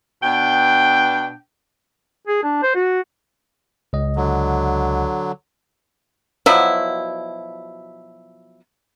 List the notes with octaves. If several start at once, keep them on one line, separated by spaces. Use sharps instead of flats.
B2 B3 D4 G5
G#4
D4
C5
F#4
C#2 D#5
D3 F#3
B2 F3 F#3 E4